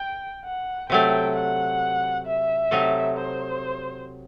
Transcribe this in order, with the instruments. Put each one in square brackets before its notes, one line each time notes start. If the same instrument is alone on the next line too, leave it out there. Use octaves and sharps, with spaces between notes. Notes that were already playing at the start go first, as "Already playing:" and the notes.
Already playing: [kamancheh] G5
F#5
[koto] C3 F#3 A3 [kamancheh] G5
[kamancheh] F#5
E5
[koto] C3 F#3 A3 D#4
[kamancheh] C5